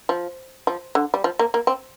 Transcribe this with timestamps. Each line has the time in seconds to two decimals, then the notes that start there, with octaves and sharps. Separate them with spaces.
0.09 F3
0.67 F3
0.95 D3
1.14 G3
1.24 F3
1.39 A#3
1.54 A#3
1.67 C4